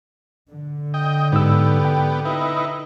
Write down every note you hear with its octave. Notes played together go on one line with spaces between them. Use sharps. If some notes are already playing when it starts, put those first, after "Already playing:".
D3
D#5 G5
G#2 B3 G4 E6
G5
D#4 E4 B4